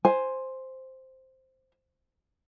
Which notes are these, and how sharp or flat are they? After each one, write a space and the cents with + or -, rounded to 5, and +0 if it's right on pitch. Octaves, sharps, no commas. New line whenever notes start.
C5 +0 G#5 +0